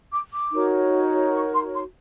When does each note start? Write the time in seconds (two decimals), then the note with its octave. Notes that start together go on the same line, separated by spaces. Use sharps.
0.12 D6
0.32 D6
0.52 D#4 F#4 A#4 C#5
1.33 C#6
1.53 C6
1.74 C6